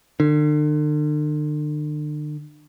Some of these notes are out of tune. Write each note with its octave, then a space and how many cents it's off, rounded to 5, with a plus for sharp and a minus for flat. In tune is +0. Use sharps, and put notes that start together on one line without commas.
D3 +40